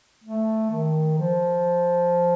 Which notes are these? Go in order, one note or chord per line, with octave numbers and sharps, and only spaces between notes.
A3
D#3
F3